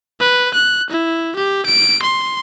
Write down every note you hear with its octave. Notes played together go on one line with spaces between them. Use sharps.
B4
F#6
E4
G4
D7
C6